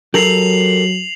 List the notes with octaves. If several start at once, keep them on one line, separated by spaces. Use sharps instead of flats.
F#3 G4 A4 A#4 C7 F7 F#7